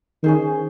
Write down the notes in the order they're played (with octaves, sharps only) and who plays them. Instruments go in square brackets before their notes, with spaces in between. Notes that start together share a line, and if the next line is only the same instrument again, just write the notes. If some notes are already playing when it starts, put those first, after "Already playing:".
[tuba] D#3 [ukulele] C#4 G#4 C5